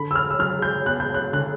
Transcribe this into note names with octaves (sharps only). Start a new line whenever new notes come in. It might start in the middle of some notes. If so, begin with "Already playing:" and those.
Already playing: D3 B5
E6
F6
E6
F#3 F6
G6
B3 F#6
G6
F#6
D3 F#6